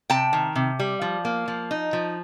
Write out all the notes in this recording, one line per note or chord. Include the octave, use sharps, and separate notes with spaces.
C3 G5 A5
D#3
C3
G3
F3
A#3
F3
D#4
F3